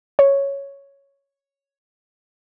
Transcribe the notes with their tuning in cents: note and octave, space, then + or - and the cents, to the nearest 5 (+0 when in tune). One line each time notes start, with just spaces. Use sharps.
C#5 +0